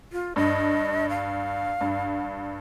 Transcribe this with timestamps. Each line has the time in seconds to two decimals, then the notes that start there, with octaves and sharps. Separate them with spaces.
0.13 F4
0.36 G2 D#5
1.09 F5
1.81 G2